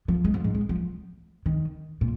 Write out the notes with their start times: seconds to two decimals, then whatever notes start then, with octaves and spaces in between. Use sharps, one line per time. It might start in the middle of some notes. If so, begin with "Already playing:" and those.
0.08 F3
0.24 G#3
0.34 F3
0.44 G#2
0.54 G#3
0.69 F3
1.46 D#3
2.01 A#2